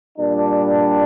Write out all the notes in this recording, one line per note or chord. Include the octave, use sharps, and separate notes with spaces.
A#2 G3 D4